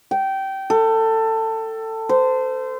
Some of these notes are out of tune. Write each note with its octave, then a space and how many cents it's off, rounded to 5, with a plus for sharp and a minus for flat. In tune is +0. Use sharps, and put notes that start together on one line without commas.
G5 -20
A4 +20
C5 -25